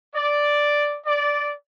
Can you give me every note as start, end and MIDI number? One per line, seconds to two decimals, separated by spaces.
0.15 0.98 74
1.05 1.53 74